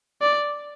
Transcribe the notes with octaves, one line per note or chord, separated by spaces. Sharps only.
D5